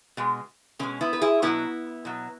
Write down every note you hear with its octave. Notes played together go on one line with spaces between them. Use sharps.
B2 G#3
B2 G#3 C#4
B3 E4
B4
E4 G#4
B2 F#3 B3 E4
B2 F#3